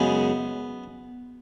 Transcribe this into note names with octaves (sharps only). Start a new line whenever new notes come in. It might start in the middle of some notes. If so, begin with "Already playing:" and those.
Already playing: F#2 C#3 G#3 B3